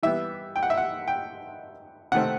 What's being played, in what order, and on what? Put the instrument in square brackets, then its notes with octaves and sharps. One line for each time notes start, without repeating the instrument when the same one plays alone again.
[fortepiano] E3 G3 B3 E5
G5
F#5
E5
F#5
G5
C3 D#3 A3 C4 F#5